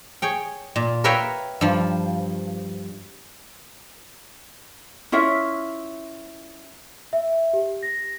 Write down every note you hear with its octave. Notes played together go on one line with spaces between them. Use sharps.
G#4 C#5 G5
A#2
A#4 B4 C#5 E5 F5 G5
G2 F3
C#4 E4 F4 E5
E5
G4
A#6